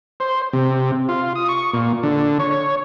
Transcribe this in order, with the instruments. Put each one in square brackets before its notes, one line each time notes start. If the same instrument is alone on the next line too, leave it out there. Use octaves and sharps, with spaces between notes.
[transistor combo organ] C5
C3
F4
D#6
C#6
A#2
D3
C#5